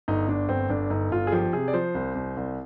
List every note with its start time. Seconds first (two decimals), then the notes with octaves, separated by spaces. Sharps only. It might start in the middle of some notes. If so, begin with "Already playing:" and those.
0.08 G1 D#4
0.28 G1 D4
0.49 G1 C4
0.70 G1 D4
0.90 G1 D#4
1.11 G1 F4
1.27 G#4
1.32 F3 G4
1.53 C3 G#4
1.68 D5
1.73 F3 C5
1.95 C2
2.15 C2
2.37 C2